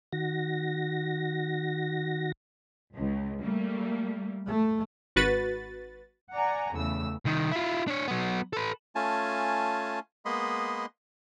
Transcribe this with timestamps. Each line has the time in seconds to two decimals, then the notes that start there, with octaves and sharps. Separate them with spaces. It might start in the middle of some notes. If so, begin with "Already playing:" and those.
0.13 D#3 F#4 A#6
2.95 C#2
3.41 G3 A3 A#3
4.47 A3
5.16 G#1 F#4 B4 A6
6.34 D5 F#5 G#5 A#5
6.74 E2 A2 C#3 E6
7.25 C2 D#3
7.52 E4 F4
7.88 D4 C#5
8.08 F#3 B3
8.53 A4 B4
8.95 A3 C#4 F4 G#5 A5
10.25 G#3 A#3 B3 D#5 B5 C6